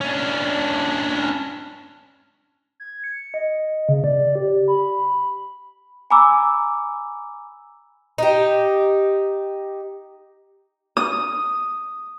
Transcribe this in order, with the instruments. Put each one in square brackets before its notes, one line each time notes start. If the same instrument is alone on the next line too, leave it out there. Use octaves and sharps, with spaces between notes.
[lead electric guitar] C#4 D4
[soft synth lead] G#6
C#7
D#5
C#3
D5
G4
B5
[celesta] G#5 A#5 B5 D6 E6
[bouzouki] D#4 G4
[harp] D#6